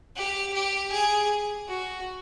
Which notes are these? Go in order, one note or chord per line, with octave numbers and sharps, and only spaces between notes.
G4
G4
G#4
F#4